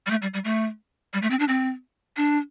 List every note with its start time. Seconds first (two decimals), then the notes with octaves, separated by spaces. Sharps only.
0.07 G3
0.11 A3
0.22 G3
0.34 G3
0.45 A3
1.14 G3
1.22 A3
1.31 C4
1.39 D4
1.48 C4
2.17 D4